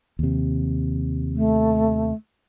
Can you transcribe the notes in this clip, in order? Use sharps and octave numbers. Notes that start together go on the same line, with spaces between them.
D#2 C3
A3